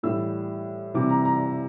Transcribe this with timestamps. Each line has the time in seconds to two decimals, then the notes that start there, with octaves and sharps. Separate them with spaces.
0.03 A2 E3 G3 E6
0.94 C3 E3 G3 D6
1.10 A#5
1.25 A#5